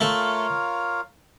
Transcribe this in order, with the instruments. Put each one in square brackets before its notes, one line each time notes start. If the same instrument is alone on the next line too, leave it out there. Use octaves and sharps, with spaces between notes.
[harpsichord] A3 A4 [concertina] F4 A#4 C#5 F5